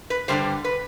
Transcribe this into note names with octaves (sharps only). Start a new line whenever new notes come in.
B4
G2 D3 G3 C5
B4